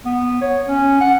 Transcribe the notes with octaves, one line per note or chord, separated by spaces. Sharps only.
B3
C#5
C#4
F#5